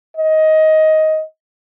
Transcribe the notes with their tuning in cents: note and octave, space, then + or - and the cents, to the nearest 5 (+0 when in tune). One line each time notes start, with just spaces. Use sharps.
D#5 +15